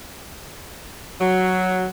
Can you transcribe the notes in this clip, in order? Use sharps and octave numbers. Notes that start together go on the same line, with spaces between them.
F#3